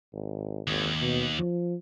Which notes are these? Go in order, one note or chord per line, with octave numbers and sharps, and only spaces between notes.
G#1
G#1 D#2
B2
F3